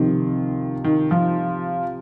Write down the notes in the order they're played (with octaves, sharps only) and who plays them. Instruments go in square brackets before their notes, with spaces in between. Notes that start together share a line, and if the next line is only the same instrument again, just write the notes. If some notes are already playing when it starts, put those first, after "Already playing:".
Already playing: [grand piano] C3 F3 C4 [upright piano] D#3
[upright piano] D#3
F3